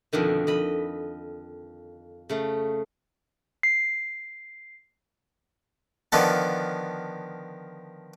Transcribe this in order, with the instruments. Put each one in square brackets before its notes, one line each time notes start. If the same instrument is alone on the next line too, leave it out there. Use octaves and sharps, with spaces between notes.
[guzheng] F2 B2 D3 D#3
F2 D#5 B5
C#3 A3
[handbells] C7
[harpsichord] D3 D#3 F3 B3 A4